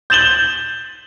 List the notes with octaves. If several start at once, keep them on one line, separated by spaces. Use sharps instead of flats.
G6 A6 E7 F#7 G7